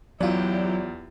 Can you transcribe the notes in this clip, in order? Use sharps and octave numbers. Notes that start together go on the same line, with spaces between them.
E2 F#3 E4 F4 G4 D5